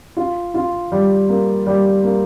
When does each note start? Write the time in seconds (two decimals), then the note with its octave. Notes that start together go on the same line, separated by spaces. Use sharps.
0.17 F4
0.54 F4
0.92 G3
1.29 A#3
1.66 G3
2.04 A#3